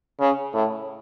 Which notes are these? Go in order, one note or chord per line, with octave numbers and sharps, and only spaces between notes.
C#3
A2